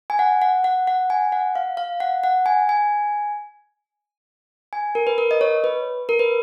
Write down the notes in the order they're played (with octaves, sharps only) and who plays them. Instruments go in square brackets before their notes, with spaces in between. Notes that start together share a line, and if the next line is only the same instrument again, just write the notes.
[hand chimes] G#5
F#5
F#5
F#5
F#5
G#5
F#5
F5
F5
F#5
F#5
G#5
G#5
G#5
A#4
B4
A#4
D#5
C#5
B4
A#4
B4